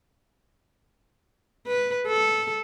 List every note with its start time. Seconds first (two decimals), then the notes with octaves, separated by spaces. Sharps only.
1.67 B4
2.07 A4